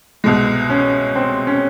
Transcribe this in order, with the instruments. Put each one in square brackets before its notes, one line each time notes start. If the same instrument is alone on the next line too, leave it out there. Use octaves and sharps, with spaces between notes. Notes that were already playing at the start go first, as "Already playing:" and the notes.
[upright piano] C2 B2 G#3
[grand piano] C#4
C4
C#4